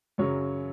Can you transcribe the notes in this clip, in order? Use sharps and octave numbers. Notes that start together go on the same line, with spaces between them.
F#2 C#3 F#3 C#5